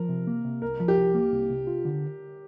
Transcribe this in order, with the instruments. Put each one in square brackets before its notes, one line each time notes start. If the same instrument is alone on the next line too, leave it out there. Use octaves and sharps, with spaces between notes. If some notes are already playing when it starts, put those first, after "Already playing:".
Already playing: [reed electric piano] F3 [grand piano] A#4
[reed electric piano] C3
A#3
C3
[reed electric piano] C2 [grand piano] A#4
[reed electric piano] F3
[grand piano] G4
[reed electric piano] C2
A#3
C2
C3
F4
D3